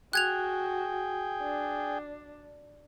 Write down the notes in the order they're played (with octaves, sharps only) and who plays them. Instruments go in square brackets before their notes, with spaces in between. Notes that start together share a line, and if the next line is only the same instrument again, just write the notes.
[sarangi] F#4 [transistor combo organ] G#4 G5 [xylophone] F#6 G#6 F7
[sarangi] D4